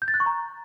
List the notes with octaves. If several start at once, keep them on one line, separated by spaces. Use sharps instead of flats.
G6
A6
F#6
C#6
A#5